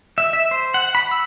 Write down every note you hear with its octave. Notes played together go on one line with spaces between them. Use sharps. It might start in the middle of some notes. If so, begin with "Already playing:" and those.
E5
E5
C5
F#5
B5
E6